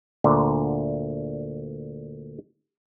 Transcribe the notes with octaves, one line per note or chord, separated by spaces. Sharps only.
D2 A#2 D3